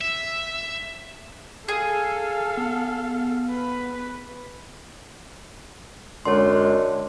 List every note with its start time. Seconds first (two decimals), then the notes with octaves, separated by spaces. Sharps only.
0.01 E5
1.68 G#4 A4 F5
2.57 B3
3.49 B4
6.25 F#2 D3 G#3 C#5 C6